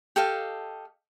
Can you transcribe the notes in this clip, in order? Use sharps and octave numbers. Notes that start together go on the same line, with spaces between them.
G4 A4 D#5 F5